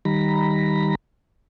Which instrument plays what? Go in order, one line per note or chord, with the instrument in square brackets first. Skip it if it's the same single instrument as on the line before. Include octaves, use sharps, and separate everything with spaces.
[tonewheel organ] D#3 G3 A#5 B5